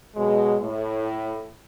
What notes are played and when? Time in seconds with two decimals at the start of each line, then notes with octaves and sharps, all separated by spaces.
0.15 B2 F#3 G#3
0.60 A2